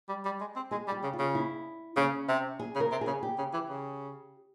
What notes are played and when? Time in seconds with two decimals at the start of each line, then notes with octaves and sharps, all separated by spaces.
0.09 G3
0.25 G3
0.40 G#3
0.56 C4
0.71 G#3 G#4
0.87 G3
0.92 G4
1.03 C#3
1.13 F4
1.19 C#3
1.35 E4
1.97 C#3 C#4
2.28 C3
2.60 G#4
2.75 C#3
2.80 A#4
2.91 C3
3.01 G#4
3.07 C#3
3.23 G4
3.38 C#3
3.53 E3
3.69 C#3